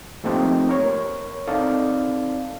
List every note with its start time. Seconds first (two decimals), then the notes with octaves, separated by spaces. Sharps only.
0.24 F3 A3 A#3 C4 D#4 G4
0.69 A#4 C#5
1.48 C4 D#4 A4 D5 F5